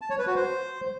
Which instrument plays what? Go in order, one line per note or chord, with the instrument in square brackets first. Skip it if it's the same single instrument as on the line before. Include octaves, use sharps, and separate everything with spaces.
[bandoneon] A5
C#5
B4
F#4
C5